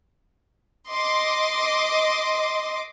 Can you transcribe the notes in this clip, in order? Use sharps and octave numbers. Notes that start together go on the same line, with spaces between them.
D#5 C6 D6